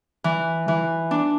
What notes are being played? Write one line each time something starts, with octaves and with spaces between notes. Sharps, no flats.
E3
E3
D4